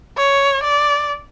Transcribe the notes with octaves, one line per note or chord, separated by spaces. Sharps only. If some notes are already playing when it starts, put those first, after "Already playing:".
C#5
D5